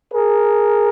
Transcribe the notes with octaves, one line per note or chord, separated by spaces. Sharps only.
G#4 A#4